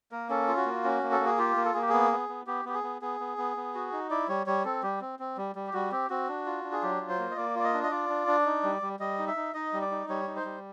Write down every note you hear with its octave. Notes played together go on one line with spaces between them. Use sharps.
A#3 A#4
C#4 A4
F4
F#4
A#3
C#4
A#3
A4
A#3
G#4
F4 G4
A#3
A4
A#3 G#4
G4
B3 G#4
B3
B3
B3 G4
B3 G4
G#4
B3
B3 G#4
B3
B3
B3
F#4
D#4
E4 D5
G3 C#5
G3 C#5
C4 A4
G3 G4
C4
C4
G3
G3
G4
G3 F#4
C4 G4
C4 F#4
D4
F4
D4
G#4
F#3 G4
F4
C5
A#3
D#5
A#3 D5
F4 D5
D#5
D4
D#5
F4 D5
D4
D4
D#4
G3
G3
G3 D#5
D#4
E5
D#4
D#4 D#5
G3
D5
D#4
G3 C#5
D#4
C5
G3